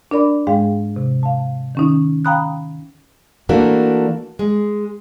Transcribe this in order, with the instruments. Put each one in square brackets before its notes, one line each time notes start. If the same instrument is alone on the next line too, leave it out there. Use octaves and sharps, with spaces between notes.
[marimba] D4 A#4 D5 B5
G#2 G#3 G#4 F5 G5
C3
F5 A5
D#3 C#4 D#4
F5 G5 A#5 B5 D#6 F#6
[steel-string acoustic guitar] E3 A3 A#3 D4 F#4 A#4
G#3